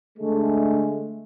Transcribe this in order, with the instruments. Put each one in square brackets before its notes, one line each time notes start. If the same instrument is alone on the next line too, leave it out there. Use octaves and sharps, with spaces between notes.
[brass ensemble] D3 G#3 A3